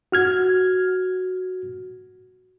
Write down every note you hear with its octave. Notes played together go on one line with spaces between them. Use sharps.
F#4 F6 G#6